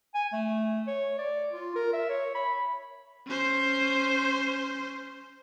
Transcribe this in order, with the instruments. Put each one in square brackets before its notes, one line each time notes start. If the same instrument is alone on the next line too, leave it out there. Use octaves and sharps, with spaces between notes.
[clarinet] G#5
A3
C#5
D5
F4
A#4
E5
C#5
B5
[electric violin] C#4 C5